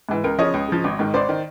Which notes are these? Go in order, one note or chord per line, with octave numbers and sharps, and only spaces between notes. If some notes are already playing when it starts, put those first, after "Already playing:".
G#2 E3
C#2 A#4
C#3 F3 C#5 D#5
C#2
C#3 F3
G#1
G#2 D#3
G#1 C5 D5
D#3